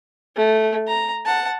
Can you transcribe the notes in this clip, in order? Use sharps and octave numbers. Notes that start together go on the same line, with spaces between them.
A3
A#5
F#5 A5